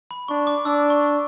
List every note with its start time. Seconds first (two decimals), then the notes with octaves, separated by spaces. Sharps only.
0.11 B5
0.28 D4 C#6
0.47 D6
0.65 D4 E6
0.90 C#6